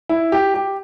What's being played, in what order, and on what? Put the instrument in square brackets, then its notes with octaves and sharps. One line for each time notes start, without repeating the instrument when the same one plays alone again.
[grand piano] E4
G4
G4